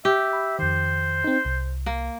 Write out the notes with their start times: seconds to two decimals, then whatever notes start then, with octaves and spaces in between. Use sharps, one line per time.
0.05 G4 E5
0.33 B5
0.59 F2 D#3 C5
1.24 C4 D#4
1.45 C2
1.86 A#3